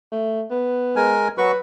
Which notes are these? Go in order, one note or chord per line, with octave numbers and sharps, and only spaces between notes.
A3
B3
G#3 A#4 G#5
F#3 F#4 B4 C#6